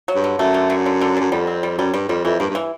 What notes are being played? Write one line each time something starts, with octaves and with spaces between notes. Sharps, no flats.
F#3
G2
D3
F#2 A3
D3
D3
D3
D3
F#2 D3
F2 G3
C4
G3
F#2 G3
G2 G3
F2 G3
F2 E3
G2 A#3
G2
E3